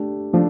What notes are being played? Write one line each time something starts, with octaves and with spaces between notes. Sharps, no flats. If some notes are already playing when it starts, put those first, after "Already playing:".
Already playing: A3 D4 G4
F3 A3 D4